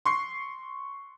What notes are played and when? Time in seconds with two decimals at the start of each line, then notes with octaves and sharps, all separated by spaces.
0.05 C6 C#6 C7